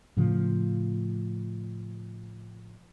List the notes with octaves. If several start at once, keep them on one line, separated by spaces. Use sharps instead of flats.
A2 C#3 F3